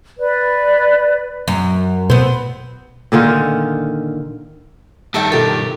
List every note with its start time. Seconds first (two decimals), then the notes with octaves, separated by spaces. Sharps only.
0.18 B4 D5
1.48 F#2
2.10 B2 B3 C4
3.12 A#2 D3 D#3 F4
5.14 G2 D#3 A4 E5 G5
5.32 B2 F4 G4 A4 A#4